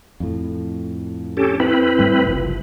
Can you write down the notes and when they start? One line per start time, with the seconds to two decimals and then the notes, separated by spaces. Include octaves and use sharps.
0.20 F2 A2
1.37 C#4 G4 A4
1.60 C4 E4 B4
1.99 G#2 G3 A3
2.25 F#1 C2 F3